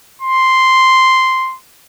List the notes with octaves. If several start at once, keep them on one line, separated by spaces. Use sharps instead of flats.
C6